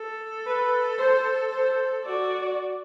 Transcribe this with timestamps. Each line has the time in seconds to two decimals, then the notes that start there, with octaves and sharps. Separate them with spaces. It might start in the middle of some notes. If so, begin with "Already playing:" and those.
Already playing: A4
0.46 B4
0.98 C5
1.52 C5
2.04 F#4 D5